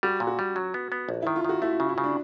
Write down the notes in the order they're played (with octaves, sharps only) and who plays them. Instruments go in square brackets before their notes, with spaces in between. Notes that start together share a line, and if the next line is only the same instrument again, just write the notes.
[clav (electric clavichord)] G3 [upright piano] F#4
[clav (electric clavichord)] A#2
[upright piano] F#4
[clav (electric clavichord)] G3
F#3
B3
B3
A#1
[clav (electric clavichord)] D#3 [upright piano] E4
[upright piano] F4
[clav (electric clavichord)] D#3 [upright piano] F#4
[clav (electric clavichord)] A3 [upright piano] E4
[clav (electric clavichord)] C#3
[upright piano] E4
[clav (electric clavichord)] C#3
[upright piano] D4